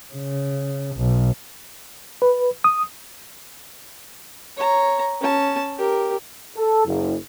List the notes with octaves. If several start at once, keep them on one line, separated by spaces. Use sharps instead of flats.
C#3
B1
B4
D#6
C#5 A#5
C#4 A5
G4 A#4
A4
F#1